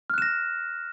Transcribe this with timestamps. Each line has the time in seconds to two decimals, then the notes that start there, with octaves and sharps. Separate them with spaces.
0.10 F6
0.14 F#6
0.18 E7
0.22 A#6